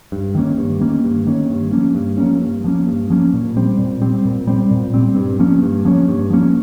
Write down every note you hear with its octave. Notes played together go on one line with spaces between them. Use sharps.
G2
D#3 A#3 C#4
G2
D#3 A#3 C#4
G2
D#3 A#3 C#4
G2
F3 A#3 C#4
G2
F3 A#3 C#4
G2
F3 A#3 C#4
G2
F3 A#3 C#4
A#2
G3 C4
A#2
G3 C4
A#2
G3 C4
A#2
G3 C4
G2
F3 A#3 C#4
G2
F3 A#3 C#4
G2
F3 A#3 C#4